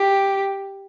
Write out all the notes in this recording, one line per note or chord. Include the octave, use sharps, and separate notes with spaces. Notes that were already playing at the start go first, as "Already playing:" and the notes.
Already playing: G4